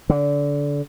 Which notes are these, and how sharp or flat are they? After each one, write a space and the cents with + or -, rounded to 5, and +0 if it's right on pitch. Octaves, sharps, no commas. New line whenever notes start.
D3 -25